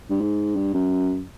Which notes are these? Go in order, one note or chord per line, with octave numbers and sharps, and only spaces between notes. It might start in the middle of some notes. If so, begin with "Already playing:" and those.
G2
G#2
G2
F#2